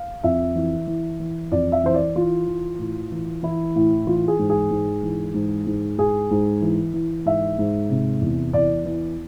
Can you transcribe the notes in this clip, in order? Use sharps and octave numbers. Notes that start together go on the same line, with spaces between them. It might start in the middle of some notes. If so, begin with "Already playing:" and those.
Already playing: F5
F2 E5
E3
E3
E3
F2 D5
E5
E3 C5
D5
E3 F4
E3
A2
E3
E3 E4
A2
E3 F4
G#4
G#2
G#4
G#2
E3
G#2
G#2
G#2 G#4
G#2
E3
E3
G#2 E5
G#2
C3
E2
E2 D5
E3